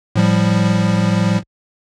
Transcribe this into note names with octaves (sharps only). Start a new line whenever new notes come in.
A2 F3 G3